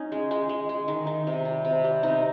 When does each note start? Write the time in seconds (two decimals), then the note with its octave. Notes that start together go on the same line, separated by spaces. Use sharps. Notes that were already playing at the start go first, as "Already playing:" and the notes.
Already playing: C#4 D#4
0.12 G#3
0.31 G#3
0.49 G#3
0.69 G#3
0.88 D#3
1.07 D#3
1.27 C3
1.45 G3
1.65 C3
1.84 G3
2.03 C3 D#4